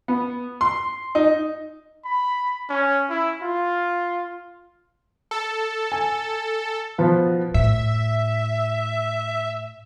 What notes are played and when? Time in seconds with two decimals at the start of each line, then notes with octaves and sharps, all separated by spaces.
0.08 B3
0.61 C6
1.15 D#4
2.05 B5
2.70 C#4
3.10 E4
3.42 F4
5.31 A4
5.92 G#5
6.98 B2 F3 B3
7.54 A2 E5